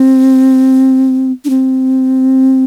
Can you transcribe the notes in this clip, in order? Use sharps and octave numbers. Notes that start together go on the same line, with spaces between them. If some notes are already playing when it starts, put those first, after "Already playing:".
Already playing: C4
D4
C4